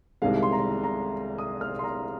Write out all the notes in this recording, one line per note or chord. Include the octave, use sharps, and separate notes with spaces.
C2 C3 D#3 G#3 F5
C6
A#5
A#5
D#6
F6
C6
A#5